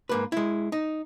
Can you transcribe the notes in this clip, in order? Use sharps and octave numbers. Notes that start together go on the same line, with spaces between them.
G#2 A#3 B4
G#3 E4
D#4